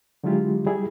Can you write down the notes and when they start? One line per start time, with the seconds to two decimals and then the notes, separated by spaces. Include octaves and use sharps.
0.24 D3 F#3 G#3 E4 F4 G4
0.66 G3 E4 G#4